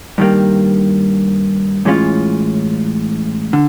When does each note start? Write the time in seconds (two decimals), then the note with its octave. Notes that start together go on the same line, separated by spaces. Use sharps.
0.18 G2 D#3 G3 A#3
1.85 A2 E3 G#3 C#4 F4
3.53 D3